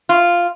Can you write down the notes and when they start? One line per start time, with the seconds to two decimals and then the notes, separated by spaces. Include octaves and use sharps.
0.09 F4